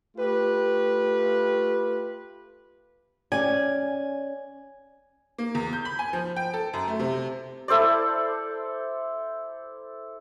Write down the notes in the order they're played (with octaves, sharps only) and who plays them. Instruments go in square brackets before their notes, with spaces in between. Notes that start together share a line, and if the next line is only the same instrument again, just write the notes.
[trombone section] A3 F4 G4 B4
[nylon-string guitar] C#4 D5 [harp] G#5
[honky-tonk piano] A#3
E2
G6
B5
G#5
F3
G5
A4
F#2
A3
C3
[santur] E4 A4 C5 D5